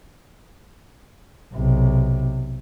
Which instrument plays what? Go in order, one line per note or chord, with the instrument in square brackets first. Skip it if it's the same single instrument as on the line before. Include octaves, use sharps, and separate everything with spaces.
[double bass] B1 C3